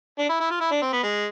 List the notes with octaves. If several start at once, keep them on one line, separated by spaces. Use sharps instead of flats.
D4
E4
E4
F4
E4
D4
C4
B3
G#3